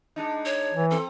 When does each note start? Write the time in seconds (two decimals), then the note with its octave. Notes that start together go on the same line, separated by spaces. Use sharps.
0.16 G#3 D4 D#4
0.45 C#5
0.74 E3
0.90 F3 C4 A4